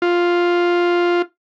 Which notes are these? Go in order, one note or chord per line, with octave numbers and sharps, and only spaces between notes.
F4